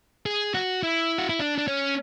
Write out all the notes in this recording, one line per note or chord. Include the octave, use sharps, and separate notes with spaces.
G#4
F#4
E4
F#4
E4
D4
D4
C#4